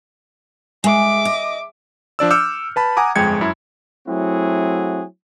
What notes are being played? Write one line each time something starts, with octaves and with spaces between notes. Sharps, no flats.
G#3 E5 D6
D#5
F3 D4 D5 E6
D6 E6 F6 G6 C#7
B4 A5 B5
F#5 G#5 A#5 D6 D#6
G1 F2 G#3 G5 G#6 C#7
F#2 E4
F#3 A3 C4 E4 F#4 G#4